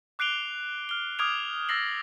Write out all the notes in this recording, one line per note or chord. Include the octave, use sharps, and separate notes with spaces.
D6 F#6 C7 D7 F7 G7
F6 G7
D6 D#6 F6 G#6 D7 F7
D#6 E6 A6 A#6 C7 F#7